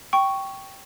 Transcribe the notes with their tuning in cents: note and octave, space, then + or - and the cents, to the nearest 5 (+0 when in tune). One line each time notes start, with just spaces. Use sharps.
G5 -10 C#6 +0